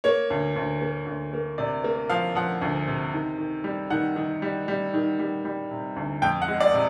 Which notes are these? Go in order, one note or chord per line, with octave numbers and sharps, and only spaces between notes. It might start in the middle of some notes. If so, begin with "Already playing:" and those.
A#3 C#5
D2
D2
A#3
D2
A#3
C3 D5
A#3
F3 F5
F3 F#5
D2
C3
D#3
D#3
G3
D#3 F#5
D#3
G3
G3
D#3
G3
G3
C3
D2
F2 G5
F#5
G#3
D5
C3